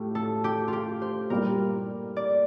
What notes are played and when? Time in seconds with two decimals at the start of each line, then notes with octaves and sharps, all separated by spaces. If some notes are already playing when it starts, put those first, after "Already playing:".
Already playing: A2 A3 F4 G4
0.15 A4
0.44 G4
0.68 F4
0.73 G4
1.02 C5
1.30 A#2 G3 A#3 A#4
2.16 D5